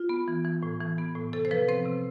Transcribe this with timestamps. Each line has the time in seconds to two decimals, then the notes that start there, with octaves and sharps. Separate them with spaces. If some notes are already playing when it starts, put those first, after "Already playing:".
Already playing: F4
0.09 B3
0.28 E3
0.44 E3
0.63 A2
0.81 E3
0.98 B3
1.16 A2
1.33 C3 A4
1.45 C5
1.51 F3 B4
1.68 C4 C5
1.85 C3